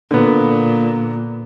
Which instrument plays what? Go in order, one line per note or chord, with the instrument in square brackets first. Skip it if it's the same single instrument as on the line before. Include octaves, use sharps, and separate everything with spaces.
[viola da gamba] A#2 [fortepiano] D3 B3